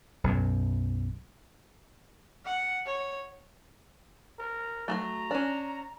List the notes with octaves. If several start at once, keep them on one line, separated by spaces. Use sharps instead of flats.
B1 F#2
F#5
C#5
A#4
F#3 G#3 A3 A#5
C#4 D4